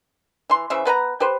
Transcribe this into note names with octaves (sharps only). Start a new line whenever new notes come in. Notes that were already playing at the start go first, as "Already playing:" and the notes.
E3 C6
C#3 E3 C5 E5
B3 B4 F#5 A#5
G4 B4 C5